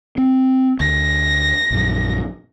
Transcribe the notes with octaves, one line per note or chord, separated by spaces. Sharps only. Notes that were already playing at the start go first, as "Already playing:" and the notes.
C4
D2 A#6
A#1 F#2